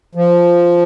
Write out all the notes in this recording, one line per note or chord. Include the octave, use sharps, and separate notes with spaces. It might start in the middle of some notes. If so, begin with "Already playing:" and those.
F3